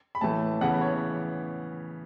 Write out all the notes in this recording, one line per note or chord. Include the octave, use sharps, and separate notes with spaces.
B5
A2 E3 A3 A5
C#3 E3 B3 F#5
C#5